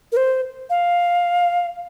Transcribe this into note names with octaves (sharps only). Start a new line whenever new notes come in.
A#4
C5
F5